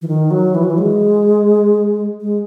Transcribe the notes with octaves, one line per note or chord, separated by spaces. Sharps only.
E3
D#3
F#3
E3
F#3
E3
G#3
G#3